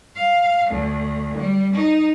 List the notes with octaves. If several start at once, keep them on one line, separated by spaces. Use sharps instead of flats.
F5
D2
G3
D#4